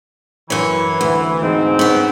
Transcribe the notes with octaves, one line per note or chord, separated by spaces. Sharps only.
F#2 E3 C#5
D2
G#2 C4
B3 C#4